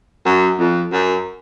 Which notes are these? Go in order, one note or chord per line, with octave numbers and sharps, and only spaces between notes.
F#2
F2
F#2